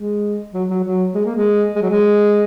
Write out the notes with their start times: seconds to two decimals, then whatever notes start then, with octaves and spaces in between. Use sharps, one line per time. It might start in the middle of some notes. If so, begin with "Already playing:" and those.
Already playing: G#3
0.54 F#3
0.70 F#3
0.84 F#3
1.14 G#3
1.25 A#3
1.36 G#3
1.76 G#3
1.82 F#3
1.90 G#3